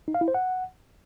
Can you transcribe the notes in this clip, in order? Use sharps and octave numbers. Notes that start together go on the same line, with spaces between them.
D#4
F5
E4
C5
F#5